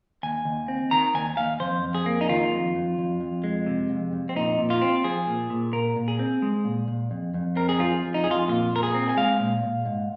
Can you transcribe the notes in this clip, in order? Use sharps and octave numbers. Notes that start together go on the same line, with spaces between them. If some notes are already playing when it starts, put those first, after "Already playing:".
D#2 G#5
D#2
C4
D#3 A#5
D#2 G#5
D#2 F5
F2 C5
F2
G#4
A#3
D#4
D#3 F4
F2
F2
F2
F2
G#3
C3
F2
F2
C4
A#2 D#4
A#2
F4
C4
F3 G#4
A#2
A#2
A#2 A#4
A#2
G#4
C4
G#3
A#2
A#2
F2
F2
C4 A#4
G#4
F3 F4
F2
D#4
F2 G#4
F4
A#2 F4
A#2 A#4
G#4
C4
G#5
G#3 F5
A#2
A#2
G#2